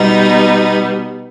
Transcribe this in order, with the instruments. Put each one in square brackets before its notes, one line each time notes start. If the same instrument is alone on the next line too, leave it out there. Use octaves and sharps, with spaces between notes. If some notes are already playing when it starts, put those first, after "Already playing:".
Already playing: [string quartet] B2 G3 B3 D#4